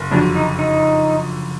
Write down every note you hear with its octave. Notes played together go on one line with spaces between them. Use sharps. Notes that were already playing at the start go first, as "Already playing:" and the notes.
Already playing: F#1
F2 D3 F#3 D4
D#4
D#4